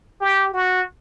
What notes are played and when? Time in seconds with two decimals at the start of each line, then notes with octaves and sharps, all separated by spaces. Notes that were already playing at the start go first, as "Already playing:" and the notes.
0.21 G4
0.54 F#4